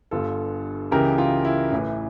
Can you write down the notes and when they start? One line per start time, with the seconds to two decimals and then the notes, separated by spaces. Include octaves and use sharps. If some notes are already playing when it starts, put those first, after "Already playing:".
0.11 G1 G2 D3 F4 A4
0.91 C#2 C#3 E3 G4 A#4
1.18 F4
1.45 E4
1.72 A1 A2 E3